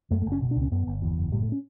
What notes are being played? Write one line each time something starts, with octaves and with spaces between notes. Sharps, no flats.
F#2 A3
A3
F#1
C#4
B2
D4
C#2
C#4
F#2 B3
G1
E2
F#1
A2 G3
A3
C#4